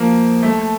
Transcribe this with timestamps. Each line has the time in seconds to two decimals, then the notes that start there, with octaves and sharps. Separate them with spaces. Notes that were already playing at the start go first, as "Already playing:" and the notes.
Already playing: F3 A#3
0.43 A3